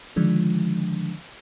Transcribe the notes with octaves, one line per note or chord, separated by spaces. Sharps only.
D3 D#3 F3 G#3 D4